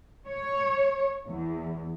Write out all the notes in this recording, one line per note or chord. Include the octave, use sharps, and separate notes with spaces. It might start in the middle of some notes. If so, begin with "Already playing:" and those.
C#5
E2